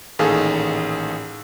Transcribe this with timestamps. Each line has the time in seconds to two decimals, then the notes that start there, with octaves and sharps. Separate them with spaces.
0.19 A1 A#2 D#3 G#4 A4 F5